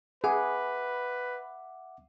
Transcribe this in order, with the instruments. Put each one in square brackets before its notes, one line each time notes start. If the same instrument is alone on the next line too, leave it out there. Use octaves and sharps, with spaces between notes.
[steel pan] G#4 [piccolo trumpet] B4 [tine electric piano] E5 F#5 D6